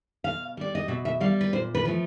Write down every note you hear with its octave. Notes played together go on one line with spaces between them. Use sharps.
B2 F5
G3 D5
D#5
B2 E5
E5
G3 F5
B4
A#2 C5
B4
F3 A3